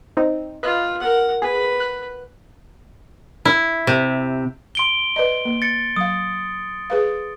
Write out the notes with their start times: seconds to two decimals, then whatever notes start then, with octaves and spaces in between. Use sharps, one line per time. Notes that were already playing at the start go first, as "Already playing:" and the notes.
0.17 C4 D#4
0.63 F4 B4 D#5 F#6
1.00 A#4 F#5
1.42 G#4 B4
1.80 F#6
3.45 E4
3.87 C3
4.75 C6 D7 G7
5.16 B4 D5 D#5
5.45 A#3
5.62 A6 C#7
5.96 F#3 F5 D#6
6.90 G#4 B4 F5